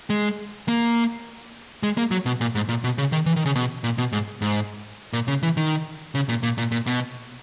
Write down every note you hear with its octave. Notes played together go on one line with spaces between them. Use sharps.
G#3
A#3
G#3
A#3
F#3
B2
A#2
G#2
A#2
B2
C#3
D#3
E3
D#3
C#3
B2
A#2
B2
G#2
G#2
A#2
C#3
E3
D#3
C#3
A#2
A#2
A#2
A#2
B2